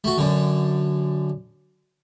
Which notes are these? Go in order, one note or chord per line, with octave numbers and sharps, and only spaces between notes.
A3 F#4
F#2 D3